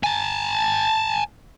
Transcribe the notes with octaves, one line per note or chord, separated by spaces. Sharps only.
G#5 A5